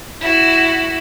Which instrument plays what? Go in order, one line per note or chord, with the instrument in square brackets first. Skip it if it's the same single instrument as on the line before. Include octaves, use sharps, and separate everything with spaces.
[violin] E4 F#4